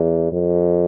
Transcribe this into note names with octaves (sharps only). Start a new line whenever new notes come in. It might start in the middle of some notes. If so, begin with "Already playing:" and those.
Already playing: E2
F2